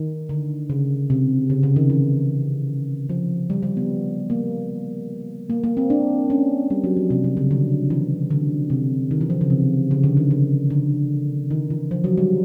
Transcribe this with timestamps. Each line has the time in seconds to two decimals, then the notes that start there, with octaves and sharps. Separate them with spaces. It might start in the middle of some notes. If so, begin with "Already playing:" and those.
Already playing: D#3
0.29 D3
0.70 C#3
1.10 C3
1.50 C#3
1.63 C#3
1.76 D#3
1.90 E3
3.09 F3
3.50 G3
3.63 G3
3.77 B3
4.30 A#3
5.50 A#3
5.64 A#3
5.77 C4
5.90 D4
6.30 C#4
6.70 G3
6.84 F#3
6.97 F3
7.10 C3
7.24 C3
7.37 C#3
7.51 D3
7.90 E3
8.31 D3
8.70 C3
9.11 D#3
9.21 E3
9.30 F3
9.41 C#3
9.50 C3
9.91 C#3
10.04 D3
10.17 D#3
10.31 C#3
10.70 D3
11.51 D#3
11.70 E3
11.91 F3
12.04 F#3
12.17 G3